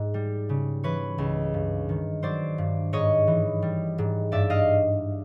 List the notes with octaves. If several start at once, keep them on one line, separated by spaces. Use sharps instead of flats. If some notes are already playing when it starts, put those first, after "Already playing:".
Already playing: G#2
G3
C#3
E3 B4 C#5
C#2
G2
D#3
F#3 C5 D5
G2
G#2 C#5 D#5
E3
G3
G#2
G2 D5 E5
D#5 F5